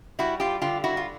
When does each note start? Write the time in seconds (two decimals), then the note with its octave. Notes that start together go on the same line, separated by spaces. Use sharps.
0.19 G3 E4 F#4
0.40 F4 G4
0.62 D3 F4 G4
0.84 E4 F#4
0.97 F4